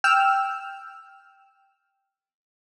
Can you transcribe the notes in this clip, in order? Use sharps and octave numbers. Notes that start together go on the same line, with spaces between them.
G5 E6 F6